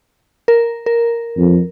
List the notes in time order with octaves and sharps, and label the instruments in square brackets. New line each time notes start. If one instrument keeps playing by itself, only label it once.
[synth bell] A#4
A#4
[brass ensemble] F2